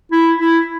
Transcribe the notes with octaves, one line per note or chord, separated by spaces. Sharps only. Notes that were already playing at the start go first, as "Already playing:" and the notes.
E4
E4